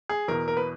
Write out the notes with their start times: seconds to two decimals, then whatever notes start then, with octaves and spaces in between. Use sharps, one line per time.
0.09 G#4
0.28 E2 B2 A#4
0.48 A#4
0.57 B4